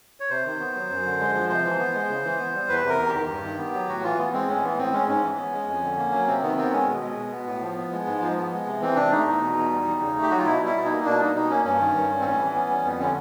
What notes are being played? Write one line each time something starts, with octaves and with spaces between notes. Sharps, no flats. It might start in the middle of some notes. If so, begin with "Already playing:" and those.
C#5
C3 C5
D#3
B3
F#3
F#2
D3
G#3
F3
C3 C5
E3
B3
G#3
C#3
E3
B3
G3
E2 B4
C3
A#4
E2
G4
D#3
G2
D#3
B3
F#3
A2 F#4
E3 F4
B3
G#3 C4
A2 C#4
E3 B3
A2 C4
G#3 C#4
G#2 C#4
E3
B3
G#3
F2
D3
A#3
F#3
C3 C4
D#3 B3
B3 C4
G#3 C#4
B2
G#3
B2
B3
A2
F3
B3
G#3
G#2
F3
B3
G#3
C3
E3 C4
C3 D4
A3 D#4
E2
B2
E2
G3
E2
C#3
A3
G4
F#3 F#4
F4
B2 E4
G3 E4
B2
D#4
A#3
B2 D4
G3 D#4
B2 D#4
A#3 C#4
G2 C#4
D#3
G2
G3
C4
A2 C#4
E3
B3
G3
F2 B3
D3 C#4